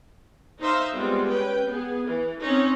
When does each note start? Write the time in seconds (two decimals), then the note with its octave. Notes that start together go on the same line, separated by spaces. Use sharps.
0.61 D#4 C5 E5 F5
0.95 G3 G#3 B3 C4 F4
1.29 C#4 B4 G5
1.67 B3 G#4
2.09 E3
2.43 C4 C#4 D#4 C#5